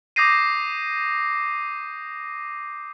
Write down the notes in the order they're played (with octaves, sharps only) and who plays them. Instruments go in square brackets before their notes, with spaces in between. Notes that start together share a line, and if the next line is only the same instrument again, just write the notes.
[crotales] D6 D#6 G6 A#6 C7 D#7